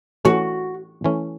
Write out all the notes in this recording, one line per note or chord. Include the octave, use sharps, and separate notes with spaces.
E3 A3 C#4 F#4
E3 A3 C#4